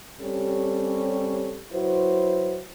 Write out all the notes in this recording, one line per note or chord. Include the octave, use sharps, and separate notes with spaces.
G3 C4 C#4 G4 A4 C#5
F#3 E4 F#4 B4 C5